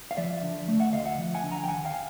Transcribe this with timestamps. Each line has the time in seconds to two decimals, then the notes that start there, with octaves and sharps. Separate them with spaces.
0.11 F5
0.17 F3 D5 E5
0.43 D3
0.68 A3
0.80 E5 F#5
0.92 D2 D#5 F5
1.05 E5 F#5
1.18 F3
1.34 F#5 G#5
1.43 D3
1.51 G#5 A#5
1.64 G5
1.68 D#2 F#5 G#5
1.85 F5 G5